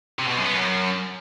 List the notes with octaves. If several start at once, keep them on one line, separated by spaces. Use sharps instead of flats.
C3
B2
F#2
B3
F#2